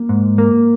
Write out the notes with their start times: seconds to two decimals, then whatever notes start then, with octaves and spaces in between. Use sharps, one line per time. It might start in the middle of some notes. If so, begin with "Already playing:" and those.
Already playing: A#3
0.09 G#2
0.38 A#3